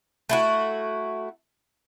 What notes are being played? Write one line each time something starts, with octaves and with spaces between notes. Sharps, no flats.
A3 E4 F#4